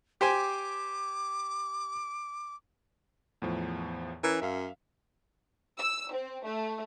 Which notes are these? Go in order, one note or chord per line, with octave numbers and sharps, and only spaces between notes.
G4 C5 G#5 D6
E2 A2 F3
E3 C#4 A#4
F#2 E5 F5
E6
C4
A3